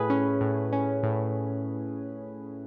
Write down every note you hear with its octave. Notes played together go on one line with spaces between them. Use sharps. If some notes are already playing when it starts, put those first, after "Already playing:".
Already playing: A2 G#4 B4
C#4
A2
C#4
A2